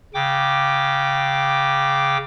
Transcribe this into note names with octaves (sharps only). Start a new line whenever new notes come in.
C#3 G5 D6